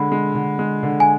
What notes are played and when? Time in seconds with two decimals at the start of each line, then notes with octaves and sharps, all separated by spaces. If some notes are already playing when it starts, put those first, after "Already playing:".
Already playing: D3 G#3 B5
0.12 G#3
0.35 D3
0.59 G#3
0.83 D3
1.00 G#5